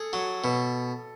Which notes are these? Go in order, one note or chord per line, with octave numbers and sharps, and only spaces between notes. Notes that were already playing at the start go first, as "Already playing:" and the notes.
Already playing: G#4 A4
F#3
B2